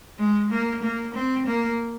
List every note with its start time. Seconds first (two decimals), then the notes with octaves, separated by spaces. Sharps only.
0.19 G#3
0.51 A#3
0.82 A#3
1.14 C4
1.46 A#3